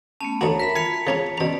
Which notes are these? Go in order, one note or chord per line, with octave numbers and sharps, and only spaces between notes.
A3 B3 C#4 A5
D2 F#4 C#5 A#5
A#4 E5 B5 B6
F4 G#5 B6 C#7 F7
C#3 C#4 A#5
B2 C#4 D5 A#5